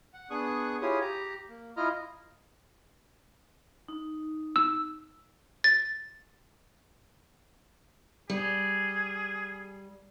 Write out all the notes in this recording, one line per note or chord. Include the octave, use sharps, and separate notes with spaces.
F#5
B3 D4 G#4 C#6 D#6 F#6
E4 F4 G4 G#4 C#5 D#6
G4 A#5
A#3
E4 F4 D#5 A#5 F6
D#4
E6
A6
G3 G#4